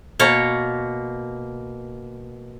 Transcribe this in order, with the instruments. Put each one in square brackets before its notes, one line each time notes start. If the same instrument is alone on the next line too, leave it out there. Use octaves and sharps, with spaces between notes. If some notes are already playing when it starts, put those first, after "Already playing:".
[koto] B2 A#3 C#5